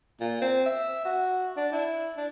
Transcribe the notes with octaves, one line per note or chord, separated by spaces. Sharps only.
A#2
C4
E5
F#4
D4
E4
D4